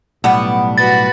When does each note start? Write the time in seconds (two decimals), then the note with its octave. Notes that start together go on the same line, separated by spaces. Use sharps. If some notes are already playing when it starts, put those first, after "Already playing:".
0.24 B1 A2 G3 B3 D4
0.78 F#4 B4 A6